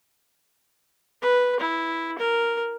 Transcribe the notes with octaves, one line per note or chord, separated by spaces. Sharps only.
B4
E4
A#4